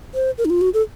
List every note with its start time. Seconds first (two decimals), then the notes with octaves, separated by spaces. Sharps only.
0.14 C5
0.38 A#4
0.45 D#4
0.50 F4
0.61 F#4
0.74 A4